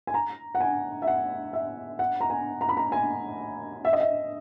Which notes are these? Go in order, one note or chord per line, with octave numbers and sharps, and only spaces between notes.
G#5
A#5
F#5
G#5
E5
F#5
E5
F#5
A#5
G#5
A#5
B5
A#5
G#5
E5
D#5
E5